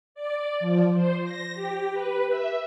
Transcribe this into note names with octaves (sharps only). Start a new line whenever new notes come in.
D5
F3
C5
A#6
G4
B4
E5